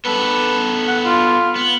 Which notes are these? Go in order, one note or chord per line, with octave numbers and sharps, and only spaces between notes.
B3 A4 B4
F#5
F4
B3